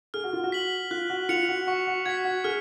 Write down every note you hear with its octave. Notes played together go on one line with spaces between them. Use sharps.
G#4 F6
F#4
F4
F#4
B6 F#7
F4 F#6
F#4
F4 C#7 F7
F#4
F#4 C#6
F#4
F#4 G#6 B6
F#4
G#4 F6